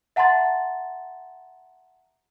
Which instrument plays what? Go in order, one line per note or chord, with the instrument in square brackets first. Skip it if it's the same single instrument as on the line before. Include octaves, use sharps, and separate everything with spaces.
[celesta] E5 F#5 A5 A#5 C6 A6